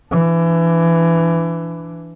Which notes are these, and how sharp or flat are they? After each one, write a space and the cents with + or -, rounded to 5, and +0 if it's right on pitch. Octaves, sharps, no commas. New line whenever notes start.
E3 +20 D4 +0